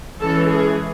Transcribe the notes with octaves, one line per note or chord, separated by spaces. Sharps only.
E3 G#3 C#4 A4
G#4